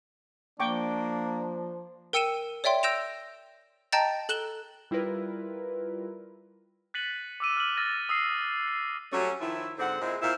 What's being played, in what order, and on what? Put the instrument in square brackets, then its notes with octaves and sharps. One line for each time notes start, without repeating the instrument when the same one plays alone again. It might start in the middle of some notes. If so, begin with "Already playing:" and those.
[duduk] F3 [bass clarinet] A#3 [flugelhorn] D4 [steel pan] G5 C#6 D6
[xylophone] A#4 G5 E6 C#7 D#7 E7
C#5 D5 E5 G5 C6
E6 G6 A#6 D7 E7 F7
D#5 G5 A5 A#5 G6 A6
A4 F#6 E7 G7
[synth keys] G3 E4 F4 A#4 B4
[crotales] F#6 A6 B6 C#7 D#7 F#7
D6 E6 D#7
F6 F#7
E6 F6 A6 A#6 D#7
D#6 E6 C7
C7
[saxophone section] F#3 G3 A3 C#4
D#3 F3 E4
G#2 D3 C4 F#5
A#2 G#3 C4 E4
A#2 C4 E4 C5 F5